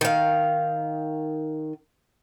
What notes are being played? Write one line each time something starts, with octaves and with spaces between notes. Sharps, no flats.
D#3 F5